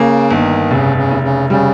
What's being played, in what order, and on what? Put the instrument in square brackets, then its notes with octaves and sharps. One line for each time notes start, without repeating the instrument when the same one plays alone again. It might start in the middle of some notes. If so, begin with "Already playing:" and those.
Already playing: [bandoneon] C#3 [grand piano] A#3
[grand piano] G1 [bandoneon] D#3
[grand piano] F1 [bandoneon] C#3
[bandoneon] C#3
[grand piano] F1
[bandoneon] C#3
[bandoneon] C#3 [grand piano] G3